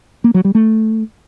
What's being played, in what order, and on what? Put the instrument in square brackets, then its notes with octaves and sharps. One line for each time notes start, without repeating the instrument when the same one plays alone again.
[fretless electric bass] A#3
F#3
G3
A3